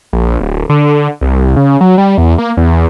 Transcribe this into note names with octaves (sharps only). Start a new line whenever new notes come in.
A#1
D1
D3
C2
C#3
F#3
G3
E2
A#3
E2